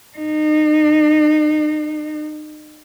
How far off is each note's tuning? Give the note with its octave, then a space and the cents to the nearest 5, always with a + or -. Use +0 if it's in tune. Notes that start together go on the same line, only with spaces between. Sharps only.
D#4 -35